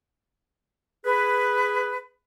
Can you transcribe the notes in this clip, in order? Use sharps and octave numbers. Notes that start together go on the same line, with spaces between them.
G#4 B4